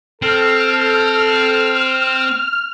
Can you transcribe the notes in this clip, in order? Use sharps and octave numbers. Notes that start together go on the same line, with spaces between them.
C4 A4 F6